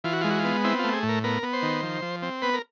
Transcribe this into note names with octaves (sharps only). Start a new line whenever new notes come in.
E3 F4
F#4
G#3 F4
F#4
F4
B3
C4 E4
F4
A3
G#4
A2
A#4
B3 A#4
B3
C5
D#3
F3
F3
C4
B3 B4
A#4